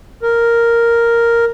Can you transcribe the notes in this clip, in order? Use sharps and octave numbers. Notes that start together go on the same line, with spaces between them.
A#4